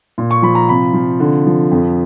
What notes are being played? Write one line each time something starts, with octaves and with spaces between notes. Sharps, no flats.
A#2
C#6
F3 B5
A#5
C3 B5
F3
D3
F3
F2